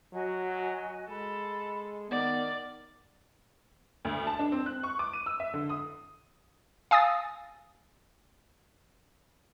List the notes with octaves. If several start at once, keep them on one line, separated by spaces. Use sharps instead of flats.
F#3 F#4 D#5 G#5
G#3 A4 B5
D#3 B3 A#4 D5 D6
D2
A5
D4
C4
F#6
C#6
D6
D#7
E6
E5
D3
D#6
F5 G#5 D#6 E6 A6